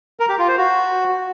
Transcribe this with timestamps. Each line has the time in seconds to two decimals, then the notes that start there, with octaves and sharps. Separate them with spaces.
0.20 A#4
0.29 G4
0.39 F4
0.48 C5
0.57 F#4